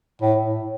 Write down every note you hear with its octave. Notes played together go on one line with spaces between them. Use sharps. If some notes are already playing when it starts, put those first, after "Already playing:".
A2